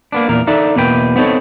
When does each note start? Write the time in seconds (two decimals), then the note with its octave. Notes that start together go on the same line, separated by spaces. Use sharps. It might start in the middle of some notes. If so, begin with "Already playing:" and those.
0.12 A#3 B3 D4
0.28 E2 A#2 A#4
0.47 D4 D#4 A4 D5 E5
0.76 E2 B2 A#3 B4 G5
1.16 B3 C4 D#4 A4 C#5